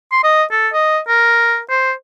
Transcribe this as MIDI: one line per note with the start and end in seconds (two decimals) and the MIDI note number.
0.12 0.20 84
0.24 0.44 75
0.51 0.69 69
0.73 1.00 75
1.08 1.59 70
1.70 1.92 72